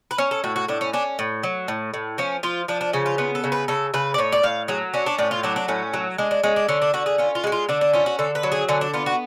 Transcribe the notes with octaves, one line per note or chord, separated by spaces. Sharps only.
B4
C#4 C#5
A4
A2 F#4
F#4
A2 D4
C#4
C#4 D4
A2
F#3
A2
A2
F3 C#4
F3 F4
F3 D4
D4
C#3 C#4
F4
B3 F4
A4
C#3
B4
C#3 A4
C#3 B4
D5
A2 C#5
D5
A2 F5
F#3 G#4
C#4 D4
D4
A2 D4
F4
F#3 D4
D4
A2 C#4
F#3
G#3 D4
D4
G#3 C#4
D4
D3 C#4
D4
D3 F#4
G#4
C#4 F4
F4
G#3 F#4
F4
D3 D4
D4
C#4 F4
F#4
D3 A4
B4
F#3
G#4
D3 C#4
D4
B3 F4
F#4